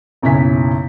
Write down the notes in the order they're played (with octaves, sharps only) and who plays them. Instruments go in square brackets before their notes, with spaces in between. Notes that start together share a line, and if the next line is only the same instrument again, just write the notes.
[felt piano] F#1 B1 C#4 E4 G#5 B6